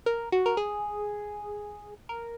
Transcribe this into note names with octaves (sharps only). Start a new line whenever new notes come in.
A#4
F#4
A#4
G#4
A#4